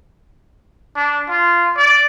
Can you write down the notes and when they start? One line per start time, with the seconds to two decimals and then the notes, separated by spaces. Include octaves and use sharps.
0.96 D4
1.30 F4
1.77 D5